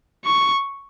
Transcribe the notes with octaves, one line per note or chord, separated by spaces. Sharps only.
C#6